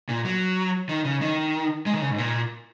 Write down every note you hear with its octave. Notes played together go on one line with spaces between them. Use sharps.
A#2
F#3
D#3
C#3
D#3
G#3
D#3
C#3
G#2
A#2